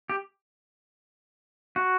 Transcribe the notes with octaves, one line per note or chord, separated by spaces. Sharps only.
G4
F#4